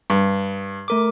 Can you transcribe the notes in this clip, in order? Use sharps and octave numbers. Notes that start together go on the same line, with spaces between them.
G2
A3 A#4 D6